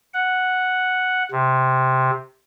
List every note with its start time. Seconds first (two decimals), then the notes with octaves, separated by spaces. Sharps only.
0.14 F#5
1.32 C3